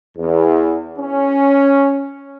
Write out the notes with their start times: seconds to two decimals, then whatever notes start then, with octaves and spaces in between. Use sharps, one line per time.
0.18 E2
0.99 C#4